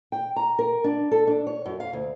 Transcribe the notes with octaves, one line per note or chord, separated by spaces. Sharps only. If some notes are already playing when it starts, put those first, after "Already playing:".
G5
A#5
A#4
D4
A4
D4
C#5
F#2
F5
D2